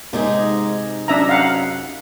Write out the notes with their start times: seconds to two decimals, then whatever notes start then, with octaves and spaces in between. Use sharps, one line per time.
0.13 G#2 C3 D#4 G#4
1.08 F#2 D4 E5 A#5
1.29 F5 F#5